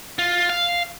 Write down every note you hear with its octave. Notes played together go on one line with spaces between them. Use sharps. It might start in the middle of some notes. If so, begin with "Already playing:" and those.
F4
F5